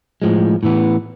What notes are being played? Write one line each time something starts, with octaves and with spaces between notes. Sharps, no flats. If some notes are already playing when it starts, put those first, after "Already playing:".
A2 F3 G#3
A2 E3 B3